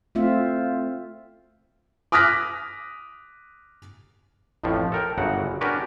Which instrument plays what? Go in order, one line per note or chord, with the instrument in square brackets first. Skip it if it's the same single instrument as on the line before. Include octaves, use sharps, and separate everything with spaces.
[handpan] A3 C4 F4 E5
[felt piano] D6 D#6 F6 F#6 A#6 B6
[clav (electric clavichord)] A1 F2 A2 F3
A4 A#4 G5
G1 F#2 C#3 F#4 F#5
C#4 D4 F#4 G4 A#4 B4